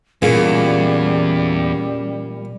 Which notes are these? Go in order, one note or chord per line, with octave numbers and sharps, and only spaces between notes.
E2 A#2 E3 G3 C#4 G#4 F5